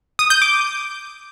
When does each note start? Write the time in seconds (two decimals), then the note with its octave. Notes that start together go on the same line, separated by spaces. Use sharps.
0.19 D#6
0.30 G6
0.42 D6